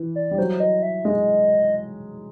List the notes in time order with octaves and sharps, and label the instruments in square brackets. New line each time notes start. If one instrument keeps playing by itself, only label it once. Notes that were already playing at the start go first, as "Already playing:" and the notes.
Already playing: [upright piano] E3
[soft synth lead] D5
[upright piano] G3
[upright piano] F#3 [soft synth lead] C5
[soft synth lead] D#5
E5
[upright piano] G#3 [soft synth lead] D#5